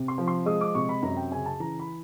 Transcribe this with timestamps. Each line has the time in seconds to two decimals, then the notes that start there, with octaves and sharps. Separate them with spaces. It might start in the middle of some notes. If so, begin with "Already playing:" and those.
Already playing: C3
0.08 C6
0.18 F3
0.28 C6
0.46 G#3 D#6
0.61 D6
0.75 C3 C#6
0.89 B5
1.02 F#2 A#5
1.17 G5
1.32 C#3 G#5
1.46 A5
1.60 E3 A#5
1.79 B5